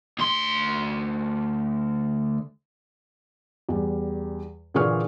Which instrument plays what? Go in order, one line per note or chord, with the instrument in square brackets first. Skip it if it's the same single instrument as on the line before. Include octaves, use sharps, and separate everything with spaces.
[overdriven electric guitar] D2 C6
[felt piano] E2 G3
A#2 D3 E3 G#4 C#6 F6